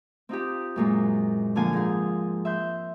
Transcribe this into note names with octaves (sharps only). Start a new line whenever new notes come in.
C4 D#4 F4 G4
F#2 A#2 G#3
D3 F3 A#3 F5 G#5
G#2 G#4
E5 C6 G6